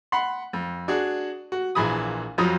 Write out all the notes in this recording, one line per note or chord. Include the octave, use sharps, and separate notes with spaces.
F#5 B5 C6
F2
D4 F#4 G#4
F#4
A#1 A#2 E3 G#4 B5 D#6
F2 F3 F#3 D#6